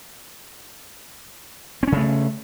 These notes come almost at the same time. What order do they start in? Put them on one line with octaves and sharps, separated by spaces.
C4 C#4 C#3 A3